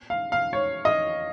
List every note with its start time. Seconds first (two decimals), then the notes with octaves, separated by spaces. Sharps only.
0.10 F5
0.32 F5
0.53 C#5
0.85 D#5